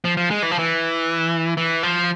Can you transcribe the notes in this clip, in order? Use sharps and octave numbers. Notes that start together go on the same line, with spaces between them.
F3
F3
G#3
E3
F3
E3
E3
F3